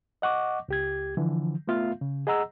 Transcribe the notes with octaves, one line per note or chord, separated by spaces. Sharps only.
D#5 F#5 C#6 D6
C#2 G4 G#6
D3 E3 F3
A3 B3 F4 E5 F5
C#3
G#4 D#5 F#5 A#5 E6